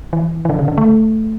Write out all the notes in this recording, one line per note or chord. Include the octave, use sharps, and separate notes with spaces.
E3
E3
D3
C#3
D3
A3